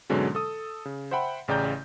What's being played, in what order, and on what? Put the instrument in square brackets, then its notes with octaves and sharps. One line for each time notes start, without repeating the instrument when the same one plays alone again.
[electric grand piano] G#2 B2 D3 F#3 G#3 C#4
A4 D#6
C#3
C5 E5 F#5 G5 B5
A1 C#3 D5 G5 A#5 G6